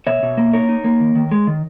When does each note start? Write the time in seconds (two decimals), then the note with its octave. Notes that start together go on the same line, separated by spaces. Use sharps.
0.07 B2 C#5 E5
0.23 B2
0.37 A#3
0.53 D#4 A#4 C#5
0.69 D#4
0.84 A#3
1.00 D#3
1.15 D#3
1.31 G#3
1.47 D#3